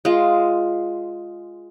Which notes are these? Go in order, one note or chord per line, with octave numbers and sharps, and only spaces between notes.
G#3 F4